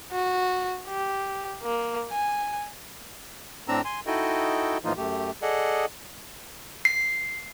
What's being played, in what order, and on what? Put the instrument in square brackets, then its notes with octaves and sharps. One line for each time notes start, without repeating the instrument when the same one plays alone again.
[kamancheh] F#4
G4
A#3
G#5
[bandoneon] A2 C4 D4 A#5 E6
G#5 C6
D#4 E4 F#4 A4 D#5 G5
A2 E3 F3 A#3 D#4 F4
F#2 A3 G4
G#4 A4 D5 D#5 F#5
[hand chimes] C7